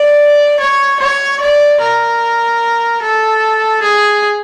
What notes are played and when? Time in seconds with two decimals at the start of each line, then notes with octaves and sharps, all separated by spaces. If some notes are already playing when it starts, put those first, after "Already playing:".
Already playing: D5
0.60 C#5
1.00 C#5
1.41 D5
1.81 A#4
3.02 A4
3.83 G#4